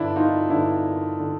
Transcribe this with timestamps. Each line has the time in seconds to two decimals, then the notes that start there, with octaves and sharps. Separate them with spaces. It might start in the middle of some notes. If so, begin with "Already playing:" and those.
Already playing: G2 D3 D4 E4
0.16 D#4 F4
0.50 G2 D3 D4 E4
1.19 D3